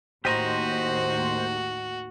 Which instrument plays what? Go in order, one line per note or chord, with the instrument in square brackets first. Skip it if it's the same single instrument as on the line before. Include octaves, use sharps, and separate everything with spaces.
[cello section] D#2 A2 D#3 [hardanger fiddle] F#4 [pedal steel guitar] G4 D#5 A#5 [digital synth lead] C5